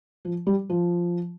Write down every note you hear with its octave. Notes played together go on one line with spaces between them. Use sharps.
F3
G3
F3